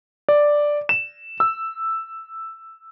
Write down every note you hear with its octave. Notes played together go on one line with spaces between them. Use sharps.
D5
E7
E6